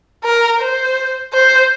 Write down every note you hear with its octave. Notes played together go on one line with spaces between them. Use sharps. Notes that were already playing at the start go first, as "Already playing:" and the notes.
A#4
C5
C5